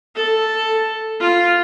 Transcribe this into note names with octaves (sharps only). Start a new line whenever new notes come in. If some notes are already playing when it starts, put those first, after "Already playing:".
A4
F4